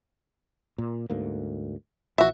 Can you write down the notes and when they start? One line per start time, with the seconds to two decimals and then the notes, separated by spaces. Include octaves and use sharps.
0.78 A#2
1.10 D2 G#2 A#3
2.18 A#1 E3 F#4 E5